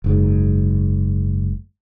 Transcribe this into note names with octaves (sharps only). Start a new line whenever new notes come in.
F#1 G#2